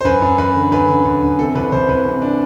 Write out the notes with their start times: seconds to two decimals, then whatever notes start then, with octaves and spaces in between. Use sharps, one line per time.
0.01 C5
0.05 F#2 B4
0.22 F#2
0.38 F#2 B4
0.55 D3
0.72 F#2 B4
0.88 D3
1.06 F#2
1.22 F#2
1.39 C3 A4
1.55 C2 B4
1.72 C2 C5
1.89 C2 B4
2.05 C3
2.22 D4